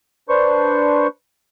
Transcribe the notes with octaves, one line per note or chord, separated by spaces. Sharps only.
D4 B4 C5 C#6